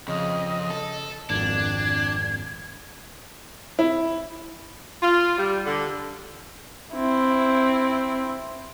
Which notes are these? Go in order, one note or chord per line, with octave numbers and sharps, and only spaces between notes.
F2 C#3 D#5
A4
G#1 F2 D4 G#6
E4
F4
G3
D3
C4 E4